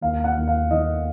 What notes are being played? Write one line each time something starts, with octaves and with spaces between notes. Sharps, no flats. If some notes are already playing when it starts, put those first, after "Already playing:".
D#2 F5
F#5
D#2
F5
D#3 D#5